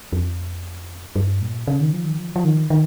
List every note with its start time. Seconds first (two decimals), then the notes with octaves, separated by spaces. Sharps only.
0.13 F2
1.16 G2
1.42 A#2
1.67 C#3
1.81 D#3
1.93 F3
2.05 D#3
2.19 F3
2.36 F3
2.45 D#3
2.70 D#3